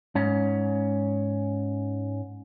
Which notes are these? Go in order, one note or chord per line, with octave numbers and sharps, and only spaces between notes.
G#2 C#4